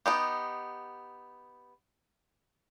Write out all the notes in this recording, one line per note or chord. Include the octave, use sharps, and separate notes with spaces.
B3 D#4 G4